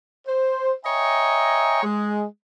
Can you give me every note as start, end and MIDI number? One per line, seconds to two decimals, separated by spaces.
0.27 0.72 72
0.85 1.81 73
0.85 1.81 75
0.85 1.81 76
0.85 1.81 79
0.85 1.81 80
0.85 1.81 82
1.83 2.24 56